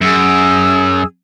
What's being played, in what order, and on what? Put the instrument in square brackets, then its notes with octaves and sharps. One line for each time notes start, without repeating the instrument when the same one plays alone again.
[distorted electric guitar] F#2 [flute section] G#4 E6